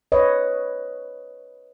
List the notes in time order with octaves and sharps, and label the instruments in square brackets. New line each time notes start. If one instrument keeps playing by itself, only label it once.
[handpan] B4 C#5 D#5